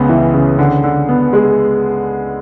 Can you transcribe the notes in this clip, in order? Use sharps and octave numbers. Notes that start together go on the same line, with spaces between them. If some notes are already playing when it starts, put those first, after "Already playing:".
Already playing: C#2 C#3 B3
E3
C#3
D3
D3
B3
G#3